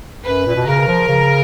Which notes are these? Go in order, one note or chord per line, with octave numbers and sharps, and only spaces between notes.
F#2 B4
A#2
B2
C#3 A#4
F3
C#3